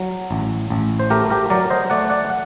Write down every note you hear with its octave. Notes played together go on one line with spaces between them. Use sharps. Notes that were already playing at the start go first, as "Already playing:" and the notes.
Already playing: F#3
A1
A1
C5
A3 G4 A#4
G4 A#4
F#3 A#4 D5
C5 D#5
A3 D5 F#5
D5 F#5
F#5